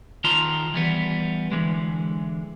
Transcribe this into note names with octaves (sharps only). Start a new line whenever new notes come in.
D#3 F4 A5 A#5 C6
E3 G3 B3
D3 E3 G#3